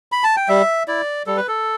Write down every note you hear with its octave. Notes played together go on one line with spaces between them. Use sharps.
B5
A5
G5
G3 E5
E4 D5
G3 A4
B4
A4